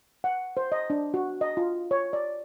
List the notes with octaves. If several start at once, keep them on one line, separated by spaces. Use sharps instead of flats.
F#5
C5
D#5
D4
F#4
D#5
F4
C#5
D5